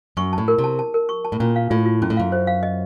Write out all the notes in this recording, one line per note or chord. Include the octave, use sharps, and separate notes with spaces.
F#2 C#6
A2 A5
A#4
C3
A5
A5
A#4
C#6
A5
A2
A#2 C#4
F5
A2 F4
F4
F#2 C#4
A2
F#2 F5
C5
F5
D#5